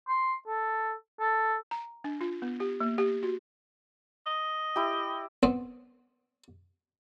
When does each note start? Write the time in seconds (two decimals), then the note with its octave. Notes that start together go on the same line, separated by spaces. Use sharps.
0.08 C6
0.47 A4
1.20 A4
1.71 A#5
2.04 D4
2.21 F4
2.42 B3
2.60 G4
2.80 A#3
2.98 G4
3.23 F#4
4.26 D#5
4.76 E4 G4
5.43 B3 C4